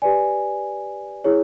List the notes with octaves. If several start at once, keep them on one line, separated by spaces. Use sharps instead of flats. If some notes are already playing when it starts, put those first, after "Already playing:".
G4 B4 D5 G#5
E4 G#4 C#5